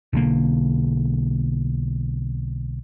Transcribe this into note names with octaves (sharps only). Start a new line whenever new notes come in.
B1 D3 A#3